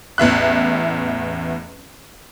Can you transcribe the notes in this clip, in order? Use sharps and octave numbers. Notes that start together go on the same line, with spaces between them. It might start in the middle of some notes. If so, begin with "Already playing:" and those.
A1 E2 E5 F#6